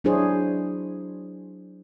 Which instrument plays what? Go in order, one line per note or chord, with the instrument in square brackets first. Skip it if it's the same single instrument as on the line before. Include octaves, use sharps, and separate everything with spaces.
[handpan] F#3 D4 E4 G#4 C5 C#5